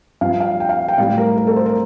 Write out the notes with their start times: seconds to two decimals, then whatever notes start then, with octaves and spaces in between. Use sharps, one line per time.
0.21 G2 F3 F5
0.40 F5
0.60 G5
0.69 F5
0.88 G5
0.98 A2 G3 F5
1.18 A#4
1.37 A#4
1.47 A4
1.56 C5
1.66 A#4